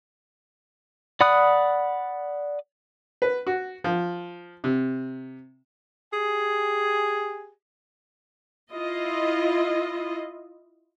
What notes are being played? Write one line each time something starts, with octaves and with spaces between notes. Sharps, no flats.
D5 F#5 B5 D#6 F#6
B4
F#4
F3
C3
G4 G#4 G#5
E4 F4 D#5